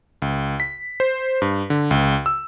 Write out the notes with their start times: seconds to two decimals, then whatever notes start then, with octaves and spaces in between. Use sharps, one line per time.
0.22 C#2
0.60 B6
1.00 C5
1.42 G2
1.70 D3
1.91 C#2
2.26 E6